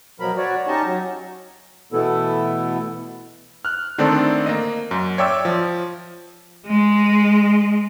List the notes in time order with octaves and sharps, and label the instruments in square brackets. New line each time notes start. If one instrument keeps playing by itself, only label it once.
[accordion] B2 F3 F#3 A#4 B5
F#4 C#5 D5
C#4 D#4 G4 D#5 A5 C#6
F#3
[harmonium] B2 E3 A3 B3 E4 A4
[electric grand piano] F6 F#6
D3 D#3 A3 C4 A4 D5
A#3 D#5
F#2
C#5 D5 E5 G5 D6 E6
F3
[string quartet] G#3